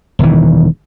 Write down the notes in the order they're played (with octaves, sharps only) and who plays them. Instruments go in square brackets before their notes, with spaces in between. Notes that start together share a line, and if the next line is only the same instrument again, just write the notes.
[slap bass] E1 D#3 E3